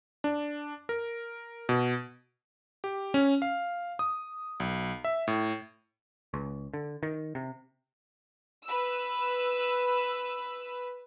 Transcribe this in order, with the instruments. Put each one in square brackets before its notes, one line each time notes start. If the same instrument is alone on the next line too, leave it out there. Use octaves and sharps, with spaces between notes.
[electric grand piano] D4
A#4
B2
G4
C#4
F5
D#6
B1
E5
A2
[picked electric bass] C#2
D3
D#3
C3
[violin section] B4 E6